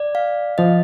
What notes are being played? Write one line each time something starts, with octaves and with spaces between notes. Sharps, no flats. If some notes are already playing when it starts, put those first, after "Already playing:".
Already playing: D5
F5
F3 D#5